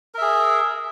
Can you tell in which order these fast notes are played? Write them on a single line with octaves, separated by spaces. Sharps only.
A#4 E5 G#4